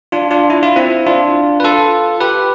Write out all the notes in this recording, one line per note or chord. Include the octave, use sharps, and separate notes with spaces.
D4 F4
D4 F4
E4
F4
C4 E4
D4 F4
B4
F4 A4
G4 B4